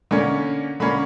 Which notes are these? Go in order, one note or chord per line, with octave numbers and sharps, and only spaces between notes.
D3 A#3 C#4
D3 A#3 C#4 B5